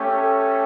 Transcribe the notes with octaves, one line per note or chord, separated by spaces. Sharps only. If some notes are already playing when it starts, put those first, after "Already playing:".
Already playing: A3 C#4 G4
A4